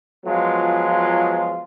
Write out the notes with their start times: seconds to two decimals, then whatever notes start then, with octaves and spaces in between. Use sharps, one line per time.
0.25 F3 F#3 G#3 B3 F4